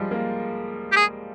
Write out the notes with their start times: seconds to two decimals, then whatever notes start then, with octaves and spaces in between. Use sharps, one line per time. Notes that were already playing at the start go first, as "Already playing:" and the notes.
Already playing: F3 G3 G#3
0.11 A#3
0.92 G4
0.96 G#4